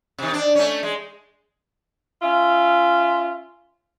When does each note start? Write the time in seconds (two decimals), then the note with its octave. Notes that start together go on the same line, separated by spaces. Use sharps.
0.18 C3 D#3
0.33 D4
0.55 A3 C#4
0.83 G#3
2.22 C#4 F4 E5